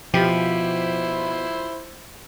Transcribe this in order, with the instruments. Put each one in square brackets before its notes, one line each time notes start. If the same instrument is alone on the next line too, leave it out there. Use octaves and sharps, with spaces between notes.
[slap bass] B2 [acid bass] F3 [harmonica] E4 C5 [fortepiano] G4